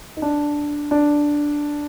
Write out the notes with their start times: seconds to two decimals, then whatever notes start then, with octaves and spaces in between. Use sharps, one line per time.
0.17 D#4
0.22 D4
0.91 D4